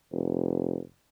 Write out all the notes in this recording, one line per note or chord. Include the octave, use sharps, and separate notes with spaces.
F1